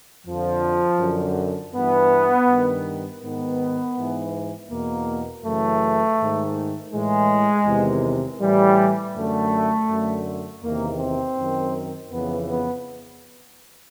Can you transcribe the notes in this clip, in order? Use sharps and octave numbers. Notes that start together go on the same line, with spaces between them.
F2 D3 F3
F#2 D3
G2 E3 B3
G2 D#3
G#2 D#3 B3
G#2 E3
E2 B2 A#3
F#2 C#3 E3 A3
G#2 D#3
A2 E3 G#3
E2 C3 D#3
A2 E3 G3
F#2 D3 A3
F#2 D3
E2 C3 D#3 A#3
C4
F#2 D#3
F2 C#3 E3 B3
B3